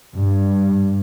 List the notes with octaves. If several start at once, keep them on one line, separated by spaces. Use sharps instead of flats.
G2